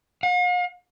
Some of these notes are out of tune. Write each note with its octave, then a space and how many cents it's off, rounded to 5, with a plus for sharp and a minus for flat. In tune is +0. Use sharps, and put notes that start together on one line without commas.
F5 +45